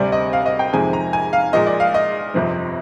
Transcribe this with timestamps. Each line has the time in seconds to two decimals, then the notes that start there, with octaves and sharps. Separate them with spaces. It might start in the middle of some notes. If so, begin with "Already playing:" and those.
Already playing: D2 C3 G3 C4 D5
0.12 D#5
0.33 F5
0.46 D#5
0.59 G5
0.73 F2 C3 D#3 G#3 C4 G#5
0.93 A#5
1.13 G#5
1.33 F5
1.53 A#1 A#2 G#3 D#5
1.67 D5
1.80 F5
1.94 D#5
2.34 G1 F2 C3 F3 C4